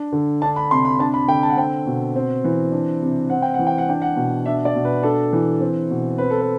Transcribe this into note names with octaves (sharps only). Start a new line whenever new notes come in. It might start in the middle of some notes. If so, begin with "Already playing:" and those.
Already playing: D4
D3
D4 A5
B5
C3 C6
B5
D4 A5
B5
D3 G5
A5
F#5
C4 G5
B2
C4
E3
D4
C3
C4 F#5
G5
E3 F#5
G5
F#5
D4 G5
F#5
B2
D4 E5
D5
B2
B4
D4 A4
E3
C4
B2
C4 B4
A4
B4